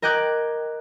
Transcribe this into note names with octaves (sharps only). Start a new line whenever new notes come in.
A#4 D#5 G5 D6 F#6 G#6